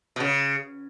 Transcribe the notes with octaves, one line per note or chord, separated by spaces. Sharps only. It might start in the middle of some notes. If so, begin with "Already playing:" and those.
B2
C#3